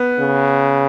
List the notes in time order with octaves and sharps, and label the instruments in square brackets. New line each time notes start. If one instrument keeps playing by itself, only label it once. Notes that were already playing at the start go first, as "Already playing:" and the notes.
Already playing: [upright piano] B3
[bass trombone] C#3